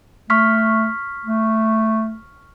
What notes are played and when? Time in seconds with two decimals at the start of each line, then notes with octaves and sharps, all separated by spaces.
0.30 A3 C#6 F6 B6
1.25 A3